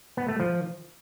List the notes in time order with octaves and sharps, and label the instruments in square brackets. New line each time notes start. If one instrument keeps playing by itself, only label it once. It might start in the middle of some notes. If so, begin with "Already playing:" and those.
[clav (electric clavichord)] B3
A3
F3